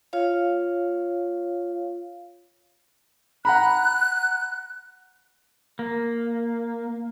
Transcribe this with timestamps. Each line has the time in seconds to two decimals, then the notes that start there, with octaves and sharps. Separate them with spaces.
0.13 F4 C#5 F5
3.45 F#5 A#5 B5 F#6
5.79 A#3